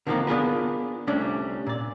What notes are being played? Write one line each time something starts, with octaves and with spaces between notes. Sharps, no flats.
D3 D#3 F3 G3 A#3 C4
B3 D4 F4 G#4 A#4 B4
C2 G3 A3 C#4 D4 C#5
A#2 D5